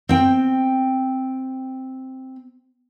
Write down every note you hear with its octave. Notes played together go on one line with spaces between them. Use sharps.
C4 G5